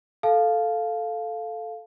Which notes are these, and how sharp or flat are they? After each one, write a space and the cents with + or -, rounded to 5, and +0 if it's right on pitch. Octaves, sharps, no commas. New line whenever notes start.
A4 +0 F5 +0 A5 -20